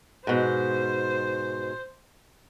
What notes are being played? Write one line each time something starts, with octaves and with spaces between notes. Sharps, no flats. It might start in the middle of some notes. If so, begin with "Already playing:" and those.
G#2 B2 C5